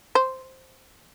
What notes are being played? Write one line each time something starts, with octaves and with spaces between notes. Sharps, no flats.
C5